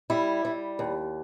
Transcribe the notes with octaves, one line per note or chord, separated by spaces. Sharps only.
G3 E4
G3
D#2